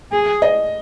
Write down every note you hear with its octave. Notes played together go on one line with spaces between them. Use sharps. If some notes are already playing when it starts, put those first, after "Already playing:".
G#4
D#5